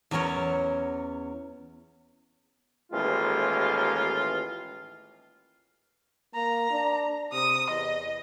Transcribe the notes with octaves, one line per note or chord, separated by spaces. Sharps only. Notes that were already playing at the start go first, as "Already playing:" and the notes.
E2 F#3 C#4 A#4 C#5
A1 D#2 G#3 F4
A#3 A#5
D4
C3 D#6
E2 D#5